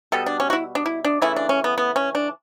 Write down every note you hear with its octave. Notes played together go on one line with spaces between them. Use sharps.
B2 G3 B3 A4
D4
C#4
F#4
E4
D4
E4
D4
C#3 E3 A3 E4
D4
C#4
B3
B3
C#4
D4